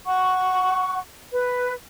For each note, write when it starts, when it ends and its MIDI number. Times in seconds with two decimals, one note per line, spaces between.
0.06 1.00 78
0.06 1.00 85
1.32 1.72 71